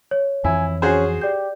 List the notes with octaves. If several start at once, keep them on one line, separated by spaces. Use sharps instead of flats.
C#5
F2 E3 E4 G#5
C#4 F#4 G#4 C5
G4 D5 G6